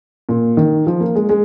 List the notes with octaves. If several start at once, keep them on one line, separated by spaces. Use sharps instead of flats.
A#2
D#3
F3
A#3
G#3
G#3